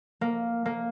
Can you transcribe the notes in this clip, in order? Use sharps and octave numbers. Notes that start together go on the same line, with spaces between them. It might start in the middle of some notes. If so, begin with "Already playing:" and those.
A#3
A#3